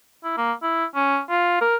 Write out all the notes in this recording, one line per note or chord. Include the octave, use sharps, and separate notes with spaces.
E4
A#3
E4
C#4
F4
A#4